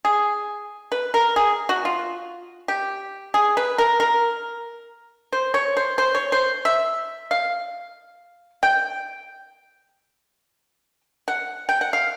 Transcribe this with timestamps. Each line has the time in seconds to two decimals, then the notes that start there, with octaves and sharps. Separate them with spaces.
0.05 G#4
0.92 B4
1.14 A#4
1.36 G#4
1.69 F#4
1.85 F4
2.68 G4
3.34 G#4
3.57 B4
3.78 A#4
4.00 A#4
5.33 C5
5.54 C#5
5.77 C5
5.98 C5
6.15 C#5
6.32 C5
6.65 E5
7.31 F5
8.63 G5
11.28 F#5
11.69 G5
11.81 F#5
11.93 F5